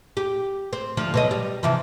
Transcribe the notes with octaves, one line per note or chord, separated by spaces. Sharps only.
G4
C4
D2 F3 F4
B2 F#3 D#5
G3
C3 E3 F3